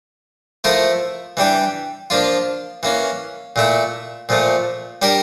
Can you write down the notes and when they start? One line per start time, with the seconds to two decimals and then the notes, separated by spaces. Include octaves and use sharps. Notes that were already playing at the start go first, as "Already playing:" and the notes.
0.64 F3 A3 E4 A#4
1.37 E3 G3 D4 G4
2.10 F3 A#3 D4 F4
2.83 E3 A#3 C#4
3.56 A#2 A3 E4
4.29 A#2 F3 A3
5.02 G3 D4 G4 A#4